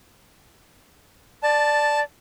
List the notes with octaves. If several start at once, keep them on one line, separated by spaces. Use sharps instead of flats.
D5 A5